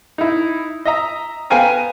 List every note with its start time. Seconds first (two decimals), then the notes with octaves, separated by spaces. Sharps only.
0.18 D#4 E4
0.85 D#5 E5 A#5
1.50 B3 F5 G5 G#5 A#5